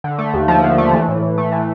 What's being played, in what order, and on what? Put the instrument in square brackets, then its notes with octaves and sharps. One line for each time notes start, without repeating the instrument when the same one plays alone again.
[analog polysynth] D3
A3
D#2
F3
D3
A3
E3
A2
A2
A3
E3